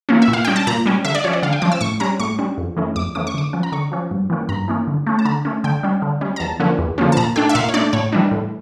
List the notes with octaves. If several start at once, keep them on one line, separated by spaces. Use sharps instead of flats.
E3 A#3 C#4
E5
A#2
F5
G3 C#4 G5
A5
A#2 A#5
G3 C#4
D3 E5
D5
F3 C#4 C#5
D5
D3 F5
G5
F3 C#4 D6
E6
A2 C#6
G3 C#4 A#5
A2 C#6
G3 C#4
F2
E3 A3 C#4
F2 D6
E3 A3 C#4 D6
C#6
D3 D6
F3 C#4
A#5
D3 C#6
F3 C#4
G2
E3 A#3 C#4
G2 A#5
E3 A#3 C#4
D3
A3 C#4
A5
D3 A#5
A3 C#4
D3 G5
G3 C#4
D3
G3 C#4
A#5
E2 A5
D3 F3 A#3 C#4
E2
D3 F3 A#3 C#4
A5
A#2 A#5
A3 D4 G5
E5
A#2 F5
C#5
A3 D4 D5
A2 C#5
E3 G3 D4
A2